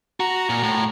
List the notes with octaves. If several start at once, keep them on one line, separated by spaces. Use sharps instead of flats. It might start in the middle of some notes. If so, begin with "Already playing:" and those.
F#4 A#5
A#2
A2